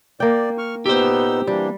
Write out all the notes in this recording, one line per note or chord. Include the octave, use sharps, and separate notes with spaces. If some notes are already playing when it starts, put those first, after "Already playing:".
A#3 D5 G5
C#6 F6
A#2 B3 D#4 G4 C5 E6
E3 G3 A#3 D4